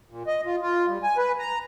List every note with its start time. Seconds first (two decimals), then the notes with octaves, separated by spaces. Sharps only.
0.10 A#2
0.27 D#5
0.46 F4
0.62 F4
0.88 G3
1.03 G#5
1.17 B4
1.39 A#5